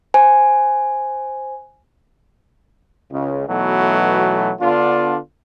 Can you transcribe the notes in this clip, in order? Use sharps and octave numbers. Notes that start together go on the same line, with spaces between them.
C5 G#5
C#2 C#3
B1 B2 E3 F#3 A3
D3 B3 D4 F4